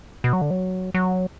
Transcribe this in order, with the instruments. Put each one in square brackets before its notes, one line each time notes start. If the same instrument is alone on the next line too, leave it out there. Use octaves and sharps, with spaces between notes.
[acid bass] B2
F#3
D3
F#3
F#3